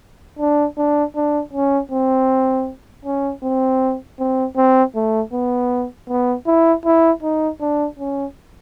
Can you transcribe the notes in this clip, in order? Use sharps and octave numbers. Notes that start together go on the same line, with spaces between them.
D4
D4
D4
C#4
C4
C#4
C4
C4
C4
A3
B3
B3
E4
E4
D#4
D4
C#4